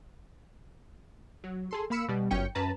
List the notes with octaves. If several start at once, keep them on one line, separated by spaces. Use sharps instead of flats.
F#3
G#4 A4 C6
A#3 F5 B5 E6 C#7
B2 G3
G1 F#2 C#4 G5 C#7
F#2 C#4 B4 A5 A#5